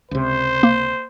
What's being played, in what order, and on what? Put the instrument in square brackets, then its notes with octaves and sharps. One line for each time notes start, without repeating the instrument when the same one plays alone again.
[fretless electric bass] C#2 C3 [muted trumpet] C5
[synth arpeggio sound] A#3